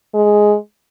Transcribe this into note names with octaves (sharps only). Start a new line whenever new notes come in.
G#3